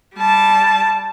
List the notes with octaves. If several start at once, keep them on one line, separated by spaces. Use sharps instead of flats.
G3 A5